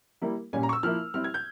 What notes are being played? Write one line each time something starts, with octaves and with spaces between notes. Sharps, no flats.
G3 A#3 E4
A#2 G3 C#4 G#5
A#5
C#6
E6
F3 A#3 E4 F6
G3 C4 E4 F6
G#6
G6